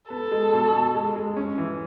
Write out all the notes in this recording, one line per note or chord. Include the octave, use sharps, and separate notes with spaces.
B3 A4
G#3
B2
B2
G#3
G#3
C#4
E3